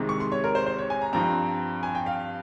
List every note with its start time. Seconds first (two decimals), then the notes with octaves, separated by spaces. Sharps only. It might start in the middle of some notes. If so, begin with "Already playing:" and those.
Already playing: C2 C3 D#3 G#3 C4
0.09 C#6
0.20 C6
0.32 C#5
0.44 A#4
0.55 C5
0.66 C5
0.78 C#5
0.90 G#5
1.02 A#5
1.13 G2 F3 C4 A#5
1.83 G#5
1.95 G5
2.06 F5